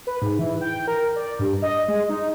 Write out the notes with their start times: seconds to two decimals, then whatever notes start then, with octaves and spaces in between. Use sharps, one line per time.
0.07 B4
0.22 G#2
0.39 E3
0.61 G5
0.88 A#4
1.16 D5
1.39 G2
1.62 D#5
1.88 G#3
2.09 D#4